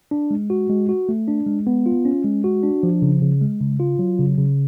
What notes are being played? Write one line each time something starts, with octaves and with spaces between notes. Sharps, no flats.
D4
G#3
F#4
G#3
F#4
A3
D4
G#3
B3
F4
C#4
G#3
F#4
D4
F3
C#3
C#3
G#3
C#3
F4
F#3
C#3
C#3